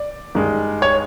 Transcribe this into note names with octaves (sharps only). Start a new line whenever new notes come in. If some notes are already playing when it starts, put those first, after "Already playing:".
Already playing: D5
G2 D#3 G#3
C#5